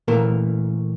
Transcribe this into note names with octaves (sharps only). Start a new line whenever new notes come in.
A#2 E3 A3 A#3 A#4